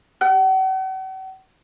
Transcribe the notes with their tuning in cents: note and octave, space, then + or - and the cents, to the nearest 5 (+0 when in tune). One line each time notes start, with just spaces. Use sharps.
F#5 +45